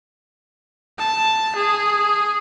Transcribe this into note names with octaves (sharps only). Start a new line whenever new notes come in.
A5
G#4